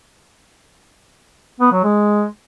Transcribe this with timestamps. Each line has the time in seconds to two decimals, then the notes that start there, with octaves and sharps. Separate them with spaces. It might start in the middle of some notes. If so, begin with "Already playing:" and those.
1.60 B3
1.72 F#3
1.84 G#3